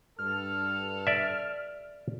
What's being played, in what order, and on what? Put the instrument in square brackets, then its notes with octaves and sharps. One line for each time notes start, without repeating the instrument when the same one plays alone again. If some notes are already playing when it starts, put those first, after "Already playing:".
[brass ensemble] G2 A4 [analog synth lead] F6
[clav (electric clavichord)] D5 E5